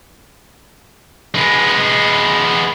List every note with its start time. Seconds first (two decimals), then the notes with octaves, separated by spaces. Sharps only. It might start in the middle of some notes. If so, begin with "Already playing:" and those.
1.35 G#3 B3